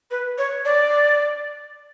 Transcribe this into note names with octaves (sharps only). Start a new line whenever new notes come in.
B4
C#5
D5